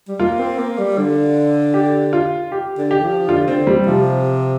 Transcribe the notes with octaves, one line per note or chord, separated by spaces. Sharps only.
G3
A#3 F4
C4
A#3
G3
D3
G4
F4
G4
D3
G4
F3
D3 F4
D3 C4
G3
C3 F3